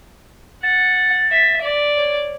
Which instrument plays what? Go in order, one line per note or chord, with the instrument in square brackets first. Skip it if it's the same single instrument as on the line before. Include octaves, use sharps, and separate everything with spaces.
[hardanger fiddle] F#5 [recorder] A6
[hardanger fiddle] E5
D5
[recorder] C#5